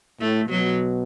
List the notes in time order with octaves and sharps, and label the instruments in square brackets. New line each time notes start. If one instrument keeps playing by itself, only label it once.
[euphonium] A2 [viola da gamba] A3
[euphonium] B2 [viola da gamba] F#3